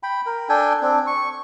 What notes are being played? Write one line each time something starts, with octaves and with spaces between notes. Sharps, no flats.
G5 B5
A#4
D4 A4 G5 G#5
C4 D4
C#6